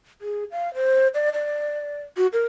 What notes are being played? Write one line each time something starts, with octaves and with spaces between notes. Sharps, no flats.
G#4
F5
C5
D5
D5
F#4
A#4